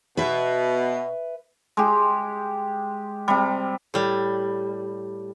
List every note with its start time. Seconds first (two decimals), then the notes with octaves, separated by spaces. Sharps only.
0.17 B2 B4 E5
1.77 G#3 G4
3.28 C3 G3
3.94 A2 G3